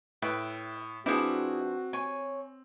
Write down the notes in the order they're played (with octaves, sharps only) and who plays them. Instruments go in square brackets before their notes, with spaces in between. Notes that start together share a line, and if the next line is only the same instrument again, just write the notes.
[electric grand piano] A2 [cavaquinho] B4 E5 G5
[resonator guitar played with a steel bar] F3 D4 B4 [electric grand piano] C4 [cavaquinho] E4 G#4 [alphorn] F#4
[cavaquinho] C#5 [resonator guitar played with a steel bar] G#5